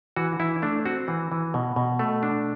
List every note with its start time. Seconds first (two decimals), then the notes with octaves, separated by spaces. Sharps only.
0.16 E3 F#4
0.40 E3 E4
0.62 A3 D4
0.85 C4 F#4
1.08 E3
1.32 E3
1.54 B2
1.76 B2
1.99 A3
2.23 D4